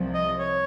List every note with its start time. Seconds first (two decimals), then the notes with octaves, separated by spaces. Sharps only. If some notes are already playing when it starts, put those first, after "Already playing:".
Already playing: C2 C3 F3
0.14 D#5
0.39 C#5